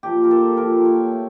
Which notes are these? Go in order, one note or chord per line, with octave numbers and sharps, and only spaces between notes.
A#2 F3 A#3 G4
A#4
A4
A#2 F3 A#3 A#4
C#5
A3